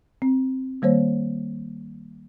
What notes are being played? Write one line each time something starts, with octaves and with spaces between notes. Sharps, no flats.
C4
D#3 G3 A#3 C5 C#5